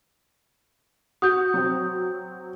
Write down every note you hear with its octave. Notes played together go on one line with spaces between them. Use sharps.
F#4 D#6 G6
F#3 C4